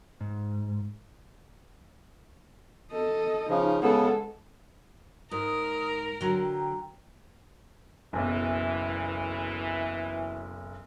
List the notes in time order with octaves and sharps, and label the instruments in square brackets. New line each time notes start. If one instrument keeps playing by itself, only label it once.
[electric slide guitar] G#2
[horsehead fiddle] A4 D#5
[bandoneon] C#3 F3 [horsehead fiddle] D#4
[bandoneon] C#3 B3 [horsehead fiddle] G#3 A4
[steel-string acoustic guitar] G#2 [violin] A#4 [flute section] D#6
[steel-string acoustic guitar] D3 F#3 [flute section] G5 A#5
[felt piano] F#1 B1 [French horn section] E3